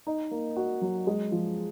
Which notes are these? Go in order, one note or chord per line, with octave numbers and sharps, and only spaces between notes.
D#4
A#3
F#4
F#3
G#3
F3